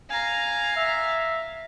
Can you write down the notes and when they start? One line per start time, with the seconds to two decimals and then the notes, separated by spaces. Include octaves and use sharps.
0.10 F5 G#5 A#5
0.76 E5